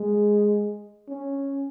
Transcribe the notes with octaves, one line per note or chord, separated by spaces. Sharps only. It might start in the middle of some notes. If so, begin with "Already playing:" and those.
Already playing: G#3
C#4